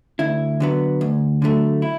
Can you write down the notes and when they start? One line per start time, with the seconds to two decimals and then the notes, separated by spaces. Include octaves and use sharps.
0.19 D2 E4
0.60 D3 F#3 B3
1.01 D2
1.42 D3 F#3 A3
1.82 E4